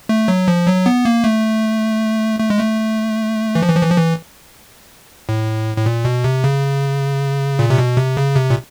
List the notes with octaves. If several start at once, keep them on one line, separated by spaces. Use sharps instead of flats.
A3
F#3
F3
F#3
B3
A#3
A3
A3
G#3
A3
E3
F3
E3
F3
E3
F3
E3
A2
A2
A#2
B2
C3
C#3
A#2
C3
B2
C3
C#3
C3
A#2